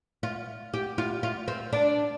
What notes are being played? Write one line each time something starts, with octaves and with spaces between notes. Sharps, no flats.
F4
G4
F4
F4
C4
D4